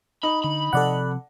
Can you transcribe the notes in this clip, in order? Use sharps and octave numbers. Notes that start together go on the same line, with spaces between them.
D#4 B5
D3 B5
C3 F3 C4 A4 D5 F#5